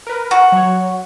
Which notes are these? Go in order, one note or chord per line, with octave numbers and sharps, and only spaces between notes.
A#4 B4
F#4
F#3 C#5